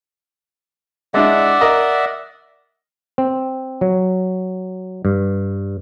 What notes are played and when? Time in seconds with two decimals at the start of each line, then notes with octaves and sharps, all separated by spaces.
1.14 G#3 D4 E4 D5 E5 F#5
1.61 A#4 D#5
3.18 C4
3.81 F#3
5.05 G2